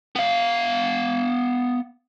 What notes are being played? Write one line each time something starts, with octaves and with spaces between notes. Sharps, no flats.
B3 F5